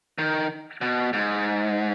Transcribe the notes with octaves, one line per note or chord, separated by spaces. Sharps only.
D#3
B2
G#2